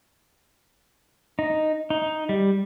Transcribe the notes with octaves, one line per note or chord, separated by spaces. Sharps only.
D#4
D#4
G3